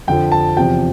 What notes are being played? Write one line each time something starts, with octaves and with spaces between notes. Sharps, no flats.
F2 D3 F3 G5
A5
E2 C3 F3 G5